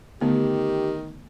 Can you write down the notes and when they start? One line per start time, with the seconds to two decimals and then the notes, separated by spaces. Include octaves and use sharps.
0.21 D3 D#3 A3 B3 G4